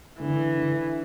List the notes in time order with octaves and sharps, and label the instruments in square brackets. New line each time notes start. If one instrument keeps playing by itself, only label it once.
[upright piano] D3 [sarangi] E3
[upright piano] D3